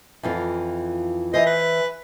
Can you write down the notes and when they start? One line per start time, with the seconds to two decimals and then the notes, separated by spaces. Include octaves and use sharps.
0.23 F2 E3 F4
1.34 E3 C5 D#5
1.46 B4